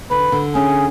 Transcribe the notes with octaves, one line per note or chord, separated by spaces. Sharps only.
D3 B4
D3
C#4 G#4